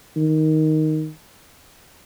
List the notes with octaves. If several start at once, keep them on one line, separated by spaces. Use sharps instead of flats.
D#3